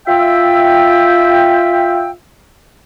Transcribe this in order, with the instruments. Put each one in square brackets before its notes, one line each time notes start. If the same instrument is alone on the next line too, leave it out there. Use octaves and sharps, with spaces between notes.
[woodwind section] F4 E5 G5